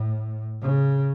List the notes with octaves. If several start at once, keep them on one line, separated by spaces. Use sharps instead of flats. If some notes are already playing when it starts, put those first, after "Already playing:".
Already playing: A2
C#3